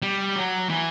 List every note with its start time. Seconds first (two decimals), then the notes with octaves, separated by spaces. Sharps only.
0.02 G3
0.36 F#3
0.69 E3